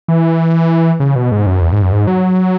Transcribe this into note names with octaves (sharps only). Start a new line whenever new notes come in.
E3
C#3
B2
G#2
F#2
E2
G#2
F#2
G#2
F#3